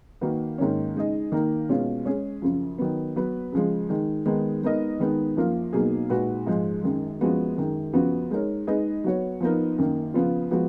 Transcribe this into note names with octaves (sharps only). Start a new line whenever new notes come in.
D#3 A#3 D#4 F#4 B4
G#2 D#3 A#3 C#4
C#3 G#3 D#4 G#4 D#5
D#3 A#3 D#4 A#4
B2 G#3 C#4 F4
G#3 C#4 G#4
F#2 C#3 F3
D#3 F#3 B3
F#3 B3 F#4 B4
C#3 F3 G#3
D#3 G#3 D#4
D#3 G#3 B3 D#4
G#3 B3 D#4 A#4 D#5
D#3 G#3 B3 D#4
F#2 F3 A#3 F4 A#4
B2 F#3 A#3 D#4 G#4
A#2 G#3 D#4 F#4 B4
G#2 F3 G#3
F#2 D#3 G#3
F#2 F3 G#3 B3 F#4
F#2 D#3 G#3
F#2 C#3 F3 B3 F#4
G#3 D#4 A#4 C#5
G#3 D#4 G#4 B4 D#5
F#3 B3 F#4 C#5
F3 B3 D#4 A#4
F#2 D#3 A#3
C#3 F3 B3 F4
F3 G#3 B3 F#4